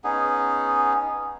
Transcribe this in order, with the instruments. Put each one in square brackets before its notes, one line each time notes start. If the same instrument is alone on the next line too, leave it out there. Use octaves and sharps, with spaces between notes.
[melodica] B3 C#4 D#4 G#4